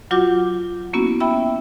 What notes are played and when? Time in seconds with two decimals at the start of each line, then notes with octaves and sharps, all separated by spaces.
0.11 F#3 F4 F#4 F#5 D6 G6
0.93 A#3 B3 C#4 E4 F#4
1.20 E5 G5 B5 E6